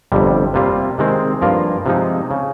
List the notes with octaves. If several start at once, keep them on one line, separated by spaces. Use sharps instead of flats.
G1 F2 C3 G3
C3 G3 A#3 F4
C3 D#3 G#3 C4
G2 F3 A#3 F4 A#4
C3 F3 G#3 D#4
C#3